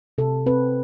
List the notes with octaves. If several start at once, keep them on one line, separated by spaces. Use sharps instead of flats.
C3 A4
C4 B4